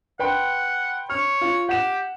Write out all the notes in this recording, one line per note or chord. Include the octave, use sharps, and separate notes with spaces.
B4 F#5 G5 C6
C#5 F6
F4
G4 F#5 E7